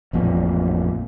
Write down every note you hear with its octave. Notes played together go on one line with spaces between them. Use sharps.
A1 F2 A#2